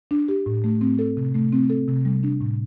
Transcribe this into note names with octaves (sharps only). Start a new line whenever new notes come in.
D4
G4
A2
A3
C4
A4
C3
A3
C4
A4
C3
G3
D4
A2